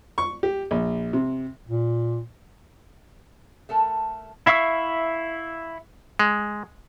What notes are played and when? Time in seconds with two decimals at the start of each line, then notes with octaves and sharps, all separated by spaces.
0.18 C#6
0.43 G4
0.71 A#1
1.13 C3
1.69 A#2
3.69 A3 A4 A#4 A5
4.46 E4 E5 F5 C#6 E6
6.19 G#3